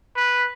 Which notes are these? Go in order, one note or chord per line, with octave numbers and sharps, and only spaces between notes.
B4